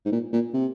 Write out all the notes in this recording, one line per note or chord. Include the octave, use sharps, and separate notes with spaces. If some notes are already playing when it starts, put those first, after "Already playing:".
G#2
A#2
A#2
C3